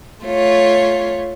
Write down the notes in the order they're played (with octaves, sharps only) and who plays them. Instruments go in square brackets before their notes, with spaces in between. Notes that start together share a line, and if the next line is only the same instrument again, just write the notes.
[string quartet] A3 F4 C#5